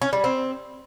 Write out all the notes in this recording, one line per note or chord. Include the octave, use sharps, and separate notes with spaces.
C#4
G3
C4